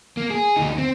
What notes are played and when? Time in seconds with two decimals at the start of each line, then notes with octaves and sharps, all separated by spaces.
0.17 A#3
0.30 G#4
0.56 D2 D#4
0.78 C4